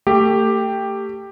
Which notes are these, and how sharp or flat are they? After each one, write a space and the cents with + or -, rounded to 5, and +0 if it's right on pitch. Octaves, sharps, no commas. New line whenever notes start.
A3 +30 G4 +5